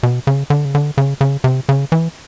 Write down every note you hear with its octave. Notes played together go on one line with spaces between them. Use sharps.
B2
C#3
D3
C#3
D3
C#3
C#3
C3
C#3
E3